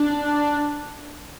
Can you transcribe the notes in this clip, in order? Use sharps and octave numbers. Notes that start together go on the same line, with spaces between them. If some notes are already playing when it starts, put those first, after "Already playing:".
Already playing: D4